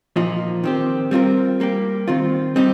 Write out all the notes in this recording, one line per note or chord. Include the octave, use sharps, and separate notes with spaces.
A#2 F3 D#4
D#3 C4 G4
G3 C4 F4 A#4
G3 A#3 G4
D#3 C4 F4
G3 C4 D#4 G4